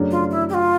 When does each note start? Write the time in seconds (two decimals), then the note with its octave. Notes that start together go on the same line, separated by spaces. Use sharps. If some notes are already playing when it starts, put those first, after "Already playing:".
Already playing: F#2 C#3 F#3 A3 D4
0.11 F4
0.31 E4
0.49 G4
0.54 F4